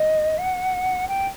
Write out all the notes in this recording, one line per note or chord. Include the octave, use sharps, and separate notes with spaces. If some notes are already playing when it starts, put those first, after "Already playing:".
Already playing: D#5
F#5
G5